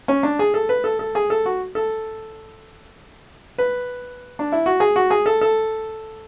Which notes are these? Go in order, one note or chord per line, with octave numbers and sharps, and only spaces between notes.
C#4
D4
G#4
A4
B4
A4
A4
G#4
A4
F#4
A4
B4
D4
E4
F#4
G#4
F#4
G#4
A4
A4